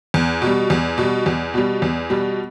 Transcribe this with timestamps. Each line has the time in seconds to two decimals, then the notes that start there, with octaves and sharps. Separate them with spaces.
0.14 E2
0.42 B2 G3
0.70 E2
0.98 B2 G3
1.26 E2
1.54 B2 G3
1.82 E2
2.10 B2 G3